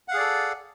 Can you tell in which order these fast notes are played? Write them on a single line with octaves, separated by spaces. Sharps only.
F#5 F5 G#4 D5 A4